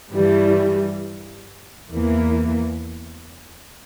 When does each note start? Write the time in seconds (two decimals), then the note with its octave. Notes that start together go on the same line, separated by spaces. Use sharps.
0.11 G2 E3 G3
1.91 E2 E3 A#3